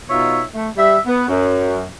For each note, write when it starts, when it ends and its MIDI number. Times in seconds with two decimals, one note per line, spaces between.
0.09 0.42 47
0.09 0.42 63
0.09 0.42 65
0.09 0.42 73
0.09 0.42 76
0.54 0.68 57
0.77 0.97 55
0.77 0.97 76
1.06 1.26 59
1.29 1.86 42